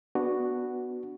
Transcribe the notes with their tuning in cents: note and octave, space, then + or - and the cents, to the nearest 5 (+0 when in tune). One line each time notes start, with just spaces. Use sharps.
B3 +0 D4 +0 F#4 +0